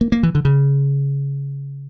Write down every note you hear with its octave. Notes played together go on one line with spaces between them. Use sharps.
A#3
A#3
E3
D3
C#3